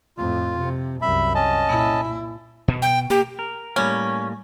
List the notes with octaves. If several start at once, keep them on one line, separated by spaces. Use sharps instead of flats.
F2 A2 F4
C3
C2 F#2 E5 B5
C#4 D#5 A5
A#2 E4
B2
G5
A#3 G4
A#4
A2 G3 A#3 C#4